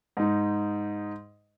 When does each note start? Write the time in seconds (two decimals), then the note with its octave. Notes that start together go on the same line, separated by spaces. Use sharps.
0.17 G#2 D#4